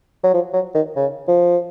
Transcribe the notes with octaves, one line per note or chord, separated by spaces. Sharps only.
F#3
F3
F#3
D#3
C#3
F3